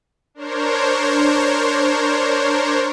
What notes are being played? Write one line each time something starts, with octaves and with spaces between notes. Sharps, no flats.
D4 A#4 C5 C#5